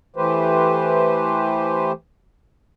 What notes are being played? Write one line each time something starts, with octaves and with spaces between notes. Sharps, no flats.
E3 A3 G4 B4 C5